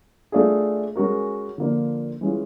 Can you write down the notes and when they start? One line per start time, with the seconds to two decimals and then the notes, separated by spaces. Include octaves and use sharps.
0.32 A3 D4 F4 G#4
0.96 G#3 C#4 F#4 A#4
1.58 D3 F3 A#3 D4 F4
2.21 E3 G#3 C#4 F4